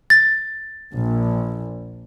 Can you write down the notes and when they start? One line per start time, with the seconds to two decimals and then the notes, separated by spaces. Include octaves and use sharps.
0.10 A6
0.93 A#1